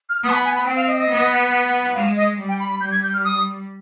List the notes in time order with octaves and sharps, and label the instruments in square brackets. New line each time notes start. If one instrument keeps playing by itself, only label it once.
[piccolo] F6
[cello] B3 [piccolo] D#6
[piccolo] G#5
B5
G#5
B5
[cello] C4 [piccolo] G5
[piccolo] F5
D#5
D#5
[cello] B3
[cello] G#3 [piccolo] F5
[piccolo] D#5
[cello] G3
[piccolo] G5
B5
B5
[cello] G3 [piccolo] G6
[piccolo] G#6
G6
F6
D#6